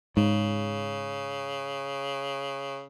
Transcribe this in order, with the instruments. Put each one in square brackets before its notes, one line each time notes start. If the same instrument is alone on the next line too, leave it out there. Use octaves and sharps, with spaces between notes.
[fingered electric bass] G#2 [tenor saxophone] C#3